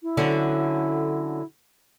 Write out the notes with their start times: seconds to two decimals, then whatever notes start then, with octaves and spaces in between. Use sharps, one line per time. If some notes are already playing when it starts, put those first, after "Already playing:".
0.03 E4
0.17 D3 F#3 C#4